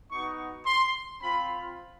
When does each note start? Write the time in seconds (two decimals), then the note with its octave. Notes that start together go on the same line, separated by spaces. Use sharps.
0.11 B3 D#4 F#4 C#6
0.66 C6
1.22 C4 F4 B5